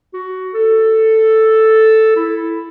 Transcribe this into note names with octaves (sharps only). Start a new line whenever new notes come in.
F#4
A4
E4